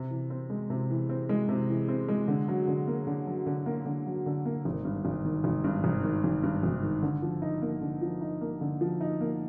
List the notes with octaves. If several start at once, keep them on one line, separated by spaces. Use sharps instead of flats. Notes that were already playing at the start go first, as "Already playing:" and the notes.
Already playing: C3
E3
C4
G#3
C3
E3
C4
G#3
C3
E3
C4
G#3
D3
F#3
D3
A#3
D3
F#3
D3
A#3
D3
F#3
D3
A#3
G#1
G2
G#1
D#3
G#1
G2
G#1
D#3
G#1
G2
G#1
D#3
D3
F3
D#4
A#3
D3
F3
D#4
A#3
D3
F3
D#4
A#3